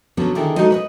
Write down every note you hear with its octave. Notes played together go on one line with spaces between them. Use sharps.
D3 F3 F#3 A#3 B3 C#4
D3 D#3 E4 G#4 A#4
G#3 D#4 F#4 A4 C5 D#5
B4 C#5 D#5